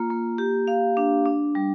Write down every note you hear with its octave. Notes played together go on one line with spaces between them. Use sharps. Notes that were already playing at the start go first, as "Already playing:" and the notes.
Already playing: A#3 F4
A#3
G4
F5
D4
D4
G3